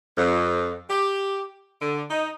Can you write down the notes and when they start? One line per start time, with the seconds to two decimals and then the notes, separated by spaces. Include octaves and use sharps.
0.17 F2
0.89 G4
1.80 D3
2.10 D#4